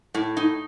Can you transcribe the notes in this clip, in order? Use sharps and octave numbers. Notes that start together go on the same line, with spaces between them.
A2
D#4